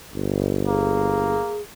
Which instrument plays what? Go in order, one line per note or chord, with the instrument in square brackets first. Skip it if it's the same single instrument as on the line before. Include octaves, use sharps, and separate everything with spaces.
[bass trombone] G1
[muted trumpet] A#3 [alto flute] G#4